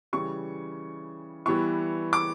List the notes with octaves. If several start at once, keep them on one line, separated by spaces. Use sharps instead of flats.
C#3 E3 G3 C#6
E3 G3 B3 E4 C#6
D6